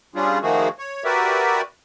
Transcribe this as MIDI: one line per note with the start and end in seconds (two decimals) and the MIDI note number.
0.15 0.39 55
0.15 0.39 61
0.15 0.39 62
0.15 0.39 65
0.15 0.39 68
0.42 0.68 51
0.42 0.68 53
0.42 0.68 57
0.42 0.68 58
0.42 0.68 66
0.42 0.68 68
0.79 1.04 73
1.05 1.61 66
1.05 1.61 67
1.05 1.61 70
1.05 1.61 71
1.05 1.61 74
1.05 1.61 76